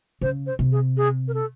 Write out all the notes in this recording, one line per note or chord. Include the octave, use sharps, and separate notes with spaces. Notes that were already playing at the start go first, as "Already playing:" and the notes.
C#3 C5
C5
C3
G#4
G#4
A#4
A4